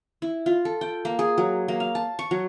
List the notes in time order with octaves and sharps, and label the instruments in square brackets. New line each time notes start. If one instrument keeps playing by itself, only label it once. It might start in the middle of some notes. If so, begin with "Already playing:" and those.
[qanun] E4
F4
A4
G5
A#3
G#4
F#3
A#3
F5
A5
C#6
F#3